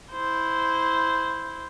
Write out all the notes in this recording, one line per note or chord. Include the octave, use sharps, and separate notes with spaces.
E4 C5